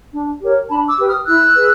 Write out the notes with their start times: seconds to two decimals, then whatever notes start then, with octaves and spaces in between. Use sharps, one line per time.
0.12 D4
0.41 G4 A#4 C#5
0.70 D4 A5 B5
0.88 D6 E6
0.99 G4 B4
1.07 D#6 F6
1.26 E4 E6 F#6
1.55 G#4 B4